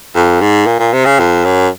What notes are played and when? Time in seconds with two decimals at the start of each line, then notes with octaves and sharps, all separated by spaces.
0.15 F2
0.41 G#2
0.67 A#2
0.79 A#2
0.93 C3
1.06 C#3
1.19 F2
1.45 F#2